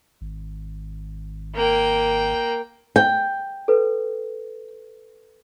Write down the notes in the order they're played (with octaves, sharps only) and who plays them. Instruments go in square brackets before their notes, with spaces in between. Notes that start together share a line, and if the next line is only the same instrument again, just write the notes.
[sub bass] G#1
[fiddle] A#3 G5
[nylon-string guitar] G5
[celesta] A4 B4